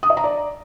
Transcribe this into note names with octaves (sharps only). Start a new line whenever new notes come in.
D#6
D#5
A#5
D5